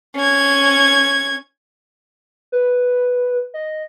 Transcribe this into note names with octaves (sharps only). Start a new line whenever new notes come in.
C#4 G#6
B4
D#5